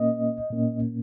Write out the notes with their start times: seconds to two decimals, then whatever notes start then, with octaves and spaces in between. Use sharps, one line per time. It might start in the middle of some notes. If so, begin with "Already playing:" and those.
Already playing: A#2 A#3 C#4 D#5
0.50 A#2 A#3 C#4